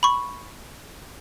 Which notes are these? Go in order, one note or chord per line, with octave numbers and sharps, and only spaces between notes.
B5 C#6